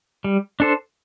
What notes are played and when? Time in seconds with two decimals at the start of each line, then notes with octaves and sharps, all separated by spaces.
0.24 G3
0.60 D4 A4 C5